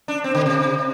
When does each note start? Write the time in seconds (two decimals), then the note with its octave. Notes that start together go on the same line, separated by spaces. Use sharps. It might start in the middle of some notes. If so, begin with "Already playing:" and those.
0.08 D4
0.24 C4
0.35 D3
0.46 C3